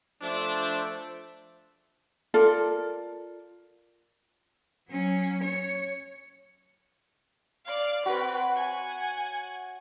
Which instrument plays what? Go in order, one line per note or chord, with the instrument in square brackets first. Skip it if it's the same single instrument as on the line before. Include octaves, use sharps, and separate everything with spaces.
[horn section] F3 A3 E5 [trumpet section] D4 [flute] C5
[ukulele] F4 A4 A#4 D5
[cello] F#3 C#4
C#5
[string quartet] D5 F5
[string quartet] C4 B4 [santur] F#4 C#5
[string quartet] F#5 G#5